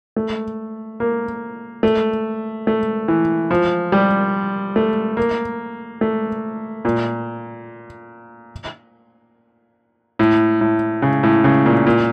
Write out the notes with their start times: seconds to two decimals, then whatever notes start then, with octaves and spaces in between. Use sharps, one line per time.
0.16 A3
1.00 A#3
1.83 A3
2.67 A3
3.08 E3
3.51 F3
3.92 G3
4.76 A3
5.17 A#3
6.01 A3
6.85 A#2
10.19 A2
10.61 A2
11.02 C#3
11.23 A2
11.44 C#3
11.66 A#2
11.87 A#2